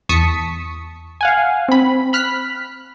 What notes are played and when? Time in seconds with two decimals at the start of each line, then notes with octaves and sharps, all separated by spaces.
0.09 E2 A5 C#6 D#6 B6 C#7
1.21 F5 F#5 G#5
1.69 C4 B5
2.13 B5 F6 F#6 B6